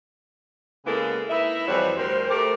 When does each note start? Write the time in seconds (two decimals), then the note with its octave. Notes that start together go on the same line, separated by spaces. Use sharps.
0.86 C#3 G#3 A#3 B3 E4 A4
1.30 D#4 E4 B4 E5
1.68 F2 E3 G3 F#4 C5 C#5
1.97 D2 G3 A#4 C5
2.29 A3 G4 A#4